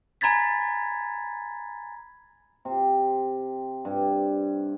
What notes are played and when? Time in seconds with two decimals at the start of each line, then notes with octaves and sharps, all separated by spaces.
0.21 G#5 A#5 B5 G#6 A6 B6
2.65 C3
3.85 G2